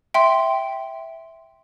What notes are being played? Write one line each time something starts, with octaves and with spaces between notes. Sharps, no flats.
E5 G5 C6